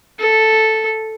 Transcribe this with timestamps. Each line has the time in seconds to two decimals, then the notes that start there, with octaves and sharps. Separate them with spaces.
0.19 A4